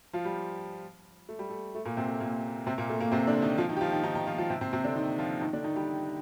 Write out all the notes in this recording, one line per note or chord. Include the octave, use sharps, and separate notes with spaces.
F3 F4
G3 G4
A3
G3
A3
A3
A#2 A#3
C3 C4
A3
A#2 A#3
C3 C4
A#2 A#3
A3
A#2 A#3
C3 C4
D3 D4
D#3 D#4
F3 F4
D#3 D#4
G4
F3 F4
D#3 D#4
D#3 D#4
D#3 D#4
F3 F4
F3 F4
C3 C4
C3 C4
C3 C4
D3 D4
D#3 D#4
F3 F4
D#3 D#4
D3 D4
D#3 D#4
G3 G4